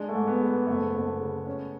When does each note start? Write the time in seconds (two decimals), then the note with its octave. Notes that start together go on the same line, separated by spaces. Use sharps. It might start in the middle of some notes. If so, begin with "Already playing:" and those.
Already playing: G#3 D4
0.09 A3
0.14 G#2
0.27 B3
0.41 G#3
0.47 B3
0.67 F#1 A3
0.94 F#1
1.20 C#3
1.47 C#4